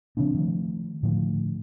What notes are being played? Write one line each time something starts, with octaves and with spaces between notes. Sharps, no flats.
C#3 F3 C4 D4
D#3 F3 A3
A2 D3 F3 A3